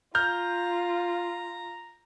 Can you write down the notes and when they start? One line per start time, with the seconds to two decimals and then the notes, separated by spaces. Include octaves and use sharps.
0.15 F4 A#5 F6 G6